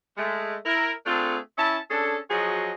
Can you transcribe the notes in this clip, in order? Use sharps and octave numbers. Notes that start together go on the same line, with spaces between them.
G#3 A3
E4 A#4
A3 C4 D4 F4 G#4 A4
C#4 E4 E5 A5
C#4 D4 G#4 A4
F3 F#3 F#4 G#4 D#5